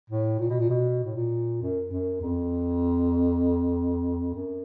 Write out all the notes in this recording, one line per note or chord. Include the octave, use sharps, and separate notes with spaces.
A2
A#2
B2
A#2
B2
A2
A#2
F#2
F#2
F2
F#2